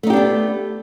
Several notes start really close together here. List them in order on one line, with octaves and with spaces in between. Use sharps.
A3 D#4 G4 D4 B3